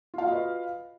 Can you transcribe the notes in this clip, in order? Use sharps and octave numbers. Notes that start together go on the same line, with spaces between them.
F4 F#4 B4 D#5 F5